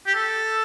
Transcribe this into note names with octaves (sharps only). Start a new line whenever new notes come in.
G4
A4